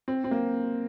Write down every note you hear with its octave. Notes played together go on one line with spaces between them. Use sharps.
C4
C4
A#3